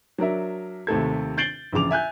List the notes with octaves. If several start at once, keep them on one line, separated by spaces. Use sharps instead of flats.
F#3 D4 A#4 E5
D#2 C3 A3 A4 G#6
G6 A6 C7 D7 F#7 G7
A#1 E2 C#3 D6 F7
E5 G#5 F#6 G6